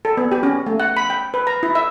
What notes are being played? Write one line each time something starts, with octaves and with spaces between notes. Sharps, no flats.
A4
B3
G4
C#4
A3
F#5
B5
G5
B4
A#5
E4
E5